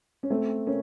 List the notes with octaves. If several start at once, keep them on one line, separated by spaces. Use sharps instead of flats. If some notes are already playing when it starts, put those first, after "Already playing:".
C#4
A3 C4
A#3 C#4